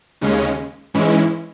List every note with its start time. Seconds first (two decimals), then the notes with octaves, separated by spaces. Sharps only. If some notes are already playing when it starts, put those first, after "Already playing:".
0.21 D#2 C#3 G#3 C#4
0.94 G#2 E3 G#3 C#4 E4